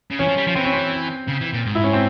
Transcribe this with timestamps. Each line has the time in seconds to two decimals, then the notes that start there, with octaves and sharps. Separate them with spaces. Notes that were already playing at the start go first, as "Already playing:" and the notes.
0.11 C#3
0.19 E3 C#4
0.28 F3
0.37 G3
0.47 F3
0.55 E3 C4
0.65 C#4
0.74 C4
1.28 C#3
1.41 E3
1.53 A#2
1.66 G#2
1.75 E4
1.84 C#4
1.93 C4